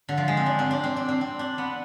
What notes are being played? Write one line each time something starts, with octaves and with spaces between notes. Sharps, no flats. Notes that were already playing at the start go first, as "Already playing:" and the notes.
D3
F3
G#3
C4
D4
C4
D4
C4
D4
C4
C4
D4
B3